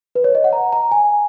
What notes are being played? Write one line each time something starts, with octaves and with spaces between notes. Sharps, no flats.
B4
C#5
D#5
F#5
A#5
A#5
G#5